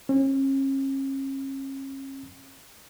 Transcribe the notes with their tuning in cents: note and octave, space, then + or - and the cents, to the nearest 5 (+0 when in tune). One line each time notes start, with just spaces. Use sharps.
C#4 -40